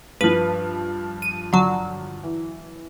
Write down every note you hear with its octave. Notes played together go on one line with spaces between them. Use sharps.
G2 F3 B4
D#7
D3 F#3
E3